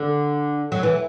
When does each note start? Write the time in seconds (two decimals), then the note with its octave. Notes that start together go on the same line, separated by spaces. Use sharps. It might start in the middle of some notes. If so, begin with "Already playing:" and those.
Already playing: D3
0.72 F#3
0.83 E3